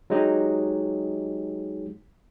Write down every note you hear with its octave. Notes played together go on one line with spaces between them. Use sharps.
F#3 G#3 D#4 G4 G#4